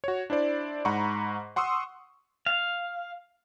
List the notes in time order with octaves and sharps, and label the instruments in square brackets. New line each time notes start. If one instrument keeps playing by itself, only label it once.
[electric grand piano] F#4 C#5
D4 E4 C5 D5
G#2 F#5 A#5 B5 C#6
F#5 C6 C#6 D#6 E6
[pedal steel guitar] F5